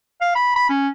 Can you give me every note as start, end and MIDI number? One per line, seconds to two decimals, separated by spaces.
0.21 0.35 77
0.36 0.54 83
0.56 0.69 83
0.69 0.88 61